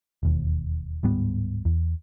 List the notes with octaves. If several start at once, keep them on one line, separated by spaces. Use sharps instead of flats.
E1 D#2
D1 G#2 G3 B3
E2